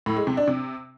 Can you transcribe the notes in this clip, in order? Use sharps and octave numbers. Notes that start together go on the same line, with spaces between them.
A2
G#3
C3
D4
C3